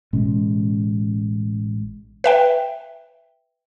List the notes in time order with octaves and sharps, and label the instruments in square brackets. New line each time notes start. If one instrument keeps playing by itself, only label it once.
[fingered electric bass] A1 B2 G#3 C#4
[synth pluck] B4 E5 G5